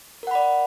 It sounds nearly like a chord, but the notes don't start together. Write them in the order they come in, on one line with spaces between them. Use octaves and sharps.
A#4 F#5 B5 D5